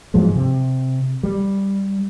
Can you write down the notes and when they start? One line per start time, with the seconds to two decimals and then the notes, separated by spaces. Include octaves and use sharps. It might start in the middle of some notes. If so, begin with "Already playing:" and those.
0.14 G#2 F3 F#3 G#3
0.35 C3
1.23 G3